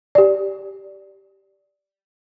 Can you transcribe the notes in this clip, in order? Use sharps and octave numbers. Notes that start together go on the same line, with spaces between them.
G4 D5